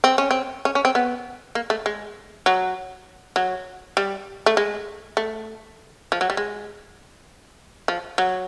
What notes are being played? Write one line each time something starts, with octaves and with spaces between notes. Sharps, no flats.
C4
C#4
C4
C#4
C#4
C4
B3
A#3
A3
G#3
F#3
F#3
G3
A3
G#3
A3
F3
F#3
G3
G#3
F3
F#3